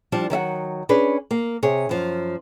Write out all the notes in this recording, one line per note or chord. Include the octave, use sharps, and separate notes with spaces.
F3 G3 D4
D#3 F#3 E5 F#5
C#4 D4 G#4 B4
A#3
C3 G#4 C#5
F#2 F3